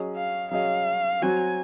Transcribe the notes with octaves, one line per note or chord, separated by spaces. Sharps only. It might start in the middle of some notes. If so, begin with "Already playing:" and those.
Already playing: F#3 C#4 G#4 D#5
F5
F#3 C#4 G#4 D#5 F5
F#3 C4 F#4 G#5